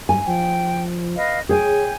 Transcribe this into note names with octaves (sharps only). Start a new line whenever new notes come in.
G2 G#5
F3 G5
B4 D#5 F5
G#4 C#5 G5 G#5